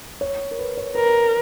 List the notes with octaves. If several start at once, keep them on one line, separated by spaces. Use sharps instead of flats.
C#5
A#4
B4
C#5
A#4 B4